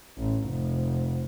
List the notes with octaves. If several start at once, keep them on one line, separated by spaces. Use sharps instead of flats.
A1
F1